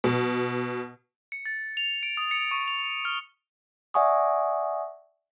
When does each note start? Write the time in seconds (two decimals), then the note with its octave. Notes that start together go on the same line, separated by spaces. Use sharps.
0.04 B2
1.32 C#7
1.46 A6
1.77 F7
2.03 D7
2.17 D#6
2.31 C#7
2.51 C#6
2.68 F7
3.05 F6
3.94 D5 E5 F#5 G#5 C#6 D#6